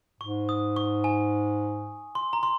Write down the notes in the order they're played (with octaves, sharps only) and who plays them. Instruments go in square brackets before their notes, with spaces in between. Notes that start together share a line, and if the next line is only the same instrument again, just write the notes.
[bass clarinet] G#2 [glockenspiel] C#6
[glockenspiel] D#6
C#6
G#5
C6
A#5
C6